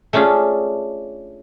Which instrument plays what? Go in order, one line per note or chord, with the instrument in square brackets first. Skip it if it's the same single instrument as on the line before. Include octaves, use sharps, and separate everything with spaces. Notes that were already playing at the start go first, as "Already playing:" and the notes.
[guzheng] A3 C#4 D4 F4 G#4